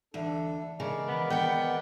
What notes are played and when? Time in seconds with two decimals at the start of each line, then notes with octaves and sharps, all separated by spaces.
0.14 D2 E3 D4 A4 E5
0.80 C#3 G#3 A#4 D5
1.08 D#3 E3 B3
1.30 B3 F#5 G5